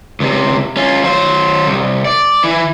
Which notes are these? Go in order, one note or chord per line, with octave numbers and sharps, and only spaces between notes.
C#2 C3
C#4 F4
F#3 C5
C2
D5
E3